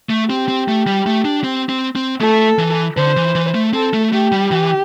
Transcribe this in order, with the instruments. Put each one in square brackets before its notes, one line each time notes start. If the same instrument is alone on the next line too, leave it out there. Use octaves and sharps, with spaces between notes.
[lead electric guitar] A3
[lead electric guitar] C4 [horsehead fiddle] G4
[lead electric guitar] C4
A3
G3
A3
D4
C4
C4
C4
[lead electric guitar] A3 [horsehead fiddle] A4
[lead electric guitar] E3
[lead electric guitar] D3 [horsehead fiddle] C5
[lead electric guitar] E3
E3
A3
[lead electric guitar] C4 [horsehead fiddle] A4
[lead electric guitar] A3
[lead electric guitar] A3 [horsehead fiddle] G4
[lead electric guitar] G3
E3